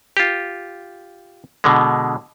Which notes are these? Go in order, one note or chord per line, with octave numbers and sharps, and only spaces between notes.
F4 G4
B2 D3 G#3